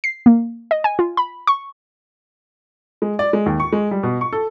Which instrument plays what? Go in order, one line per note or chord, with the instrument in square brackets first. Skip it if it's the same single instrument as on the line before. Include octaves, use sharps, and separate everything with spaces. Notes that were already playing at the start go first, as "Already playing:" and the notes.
[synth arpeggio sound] C7
A#3
D#5
G#5
F4
B5
C#6
[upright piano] G#3
D5
G#3
D#2
C#6
G#3
G3
B2
C#6
A4